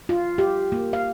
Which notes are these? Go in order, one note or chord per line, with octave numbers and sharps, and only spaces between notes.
F4
G4
A#3
F5